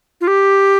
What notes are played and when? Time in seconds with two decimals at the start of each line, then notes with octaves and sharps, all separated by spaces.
0.21 F4
0.27 G4